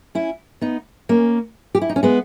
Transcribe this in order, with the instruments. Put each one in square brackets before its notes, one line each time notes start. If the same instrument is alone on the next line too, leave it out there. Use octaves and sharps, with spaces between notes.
[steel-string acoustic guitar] C#4 E4
B3 D#4
A#3 C#4
G4
E4
D#4
C#4
G#3 B3